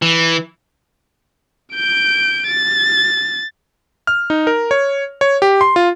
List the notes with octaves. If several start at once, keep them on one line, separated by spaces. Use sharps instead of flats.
E3
G6 D7
A6
F6
D#4
A#4
C#5
C#5
G4
C6
F4